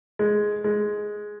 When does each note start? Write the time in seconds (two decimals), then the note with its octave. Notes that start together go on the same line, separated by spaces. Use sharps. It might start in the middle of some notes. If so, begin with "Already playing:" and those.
0.19 G#3
0.64 G#3